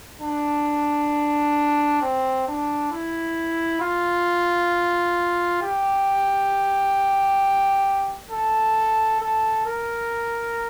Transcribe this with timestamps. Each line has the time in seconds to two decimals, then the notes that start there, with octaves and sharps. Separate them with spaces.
0.21 D4
2.01 C4
2.47 D4
2.92 E4
3.81 F4
5.62 G4
8.31 A4
9.20 A4
9.66 A#4